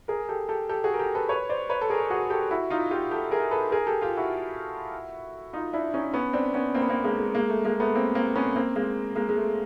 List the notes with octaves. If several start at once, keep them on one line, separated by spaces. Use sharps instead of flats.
G#4 A#4
G4 A4
G4 A4
G4 A4
F#4 G#4
A#4
G4 A4
A4 B4
B4 C#5
C5 D5
B4 C#5
A4
G#4 A#4
F#4 G#4
G4 A4
E4 F#4
D#4 F4
F4 G4
G4 A4
G#4 A#4
A4 B4
G#4 A#4
G4 A4
F4 G4
E4 F#4
D#4 F4
D4 E4
C#4 D#4
B3 C#4
C4 D4
B3 C#4
A#3 C4
B3
A#3 C4
G#3 A#3
G#3
G#3 A#3
A3
G#3 A#3
A3 B3
A#3 C4
A#3 C4
B3 C#4
A#3 C4
G#3 A#3
G#3 A#3
G#3
A3